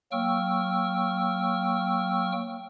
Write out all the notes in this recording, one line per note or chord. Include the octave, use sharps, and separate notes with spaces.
F#3 A#3 G5 C#6 E6 F6